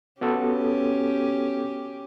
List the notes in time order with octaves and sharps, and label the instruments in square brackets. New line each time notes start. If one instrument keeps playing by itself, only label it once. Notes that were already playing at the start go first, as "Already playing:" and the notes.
[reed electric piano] B3 F#4 A4 [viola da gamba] C#4 G4